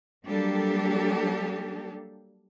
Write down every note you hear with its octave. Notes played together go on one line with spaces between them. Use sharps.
F#3 G3 A#3 D4 G4 A4